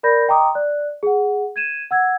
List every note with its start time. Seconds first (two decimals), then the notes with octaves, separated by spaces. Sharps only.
0.03 A#4 D5 B5 G6 A#6
0.28 D#5 G5 A#5 C6 D6 D#6
0.55 D5 F#6
1.03 G#4 F#5
1.56 G#6 D#7 E7
1.91 F#5 E6 G#6